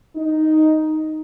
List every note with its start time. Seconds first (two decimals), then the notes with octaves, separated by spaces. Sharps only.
0.17 D#4